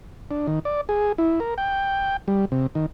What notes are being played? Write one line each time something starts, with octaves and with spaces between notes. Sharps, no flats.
D4
D#3
D5
G#4
E4
A#4
G5
G3
C3
D#3